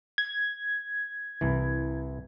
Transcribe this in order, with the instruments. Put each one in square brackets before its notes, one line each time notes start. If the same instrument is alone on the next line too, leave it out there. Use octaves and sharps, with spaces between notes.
[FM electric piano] G#6
[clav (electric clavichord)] C2 E3